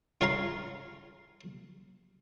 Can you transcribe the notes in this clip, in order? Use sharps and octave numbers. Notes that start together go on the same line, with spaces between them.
F4 C#5 F5 A#5 C6